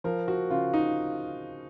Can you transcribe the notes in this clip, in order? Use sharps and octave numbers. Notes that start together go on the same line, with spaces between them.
F3 A#4
F#4
C#3 F4
D#4